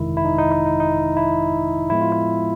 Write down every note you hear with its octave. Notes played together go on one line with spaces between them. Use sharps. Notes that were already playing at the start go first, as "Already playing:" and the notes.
Already playing: G1 F2 C3 D#3 G#3 E4
E4
D#4
D#4
D#4
D#4
D#4
E4
A2 F3 G#3 B3 E4
F4
E4